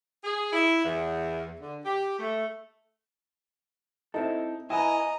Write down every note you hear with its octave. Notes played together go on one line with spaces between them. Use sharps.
G#4
E4
E2
D3
G4
A3
C4 D#4 E4 A4
E4 B4 D#5 G#5 A#5